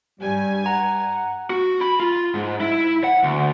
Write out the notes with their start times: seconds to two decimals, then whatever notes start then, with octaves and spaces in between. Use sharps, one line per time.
0.20 G2 G3 G#5
0.66 F#5 A#5
1.50 F#4
1.81 B5
2.00 F4
2.35 G#2
2.60 E4
3.04 F#5
3.23 D2